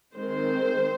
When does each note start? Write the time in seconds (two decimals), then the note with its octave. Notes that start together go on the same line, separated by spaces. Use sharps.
0.15 D#3 G#3 C4 C5